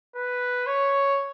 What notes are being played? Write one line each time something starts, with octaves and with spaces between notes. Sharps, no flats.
B4
C#5